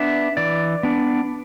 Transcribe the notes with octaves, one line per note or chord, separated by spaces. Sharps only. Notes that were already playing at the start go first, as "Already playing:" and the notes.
Already playing: B3 D4 E5
E3 D5
B3 D4